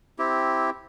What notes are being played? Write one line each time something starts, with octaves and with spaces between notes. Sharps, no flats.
C4 E4 G4